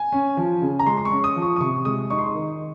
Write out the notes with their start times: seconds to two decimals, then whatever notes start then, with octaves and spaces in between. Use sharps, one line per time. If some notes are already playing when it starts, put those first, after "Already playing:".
Already playing: G#5
0.12 C#4
0.37 F3
0.62 C#3
0.79 A#5
0.86 G#3 C6
0.97 C6
1.05 C#6
1.11 C#4
1.24 D#6
1.36 F3
1.42 C#6
1.56 D#6
1.61 C3 C#6
1.85 G#3 D#6
2.10 D#4 C#6
2.18 C6
2.26 C#6
2.35 D#3